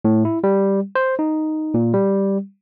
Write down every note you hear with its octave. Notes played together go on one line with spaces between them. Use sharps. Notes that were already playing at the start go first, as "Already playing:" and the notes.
A2
E4
G3
C5
D#4
A#2
G3